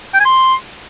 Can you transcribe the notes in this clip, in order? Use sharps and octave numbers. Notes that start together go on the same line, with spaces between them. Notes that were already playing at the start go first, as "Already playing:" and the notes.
G5
G#5
C6